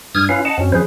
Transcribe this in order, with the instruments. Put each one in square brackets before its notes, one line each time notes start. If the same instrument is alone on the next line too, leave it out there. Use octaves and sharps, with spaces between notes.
[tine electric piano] G2 [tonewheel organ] D#6 F6 G#6
[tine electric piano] C#4 B4 G#5 [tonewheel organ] E4 F5
[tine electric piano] D#5 [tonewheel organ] F#5 A5
[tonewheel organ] F#2 [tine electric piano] C4 C#4 F#4
[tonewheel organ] F3 C5 [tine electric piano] G#4 B4